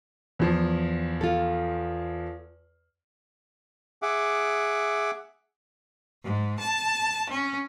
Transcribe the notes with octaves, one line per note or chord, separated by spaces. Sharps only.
E2 F3
F4 A4
G#4 E5 F#5 D6
G#2
A5
C#4